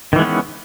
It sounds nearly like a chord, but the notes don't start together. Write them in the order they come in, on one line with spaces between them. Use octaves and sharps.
D#3 E3 G#3 B3 C#4